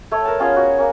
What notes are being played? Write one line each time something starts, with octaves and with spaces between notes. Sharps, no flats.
A3 C#5
A#4 A5
B3 C#4 F4 G#4
F#4
A#3 C#4 F#4